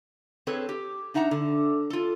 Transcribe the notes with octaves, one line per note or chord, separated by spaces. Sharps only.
C4 G#4 A4 B4 C#5
G4
D4 D#4 E5 F#5 A#5
D3
F4 A4